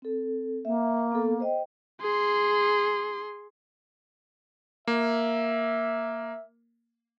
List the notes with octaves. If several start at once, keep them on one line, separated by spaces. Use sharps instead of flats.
C4 A4
A#3 E5
B3 A4
C5 D#5 G5
G#4 C6
A#3 E5